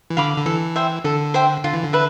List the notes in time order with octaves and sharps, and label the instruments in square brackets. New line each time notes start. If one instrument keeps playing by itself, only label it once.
[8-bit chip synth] E3
[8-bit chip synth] D3 [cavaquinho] F5 B5 D6
[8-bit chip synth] D3
[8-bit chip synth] E3 [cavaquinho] A4
[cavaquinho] C5 E5 G5
[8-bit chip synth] D3 [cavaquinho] A4
[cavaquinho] C5 E5 G5
[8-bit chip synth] D3 [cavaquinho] F4
[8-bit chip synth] E3
D3
[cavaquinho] B4 E5